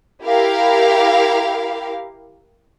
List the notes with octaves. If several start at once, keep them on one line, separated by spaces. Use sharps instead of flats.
E4 G4 A#4 F5